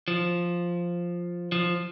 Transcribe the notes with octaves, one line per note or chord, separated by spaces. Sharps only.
F3
F3